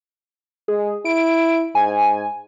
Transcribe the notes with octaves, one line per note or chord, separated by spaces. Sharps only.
G#3 G#4
E4 D7
G#2 G#5